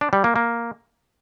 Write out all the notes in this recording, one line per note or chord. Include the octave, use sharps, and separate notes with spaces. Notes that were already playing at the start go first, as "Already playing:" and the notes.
D4
G3
A#3
A#3